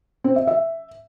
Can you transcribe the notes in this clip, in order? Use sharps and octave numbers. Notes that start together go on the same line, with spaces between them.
C4
E5
E5